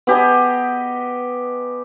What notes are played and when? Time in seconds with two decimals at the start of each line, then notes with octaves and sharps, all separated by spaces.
0.07 B3 G4 G#4 D#5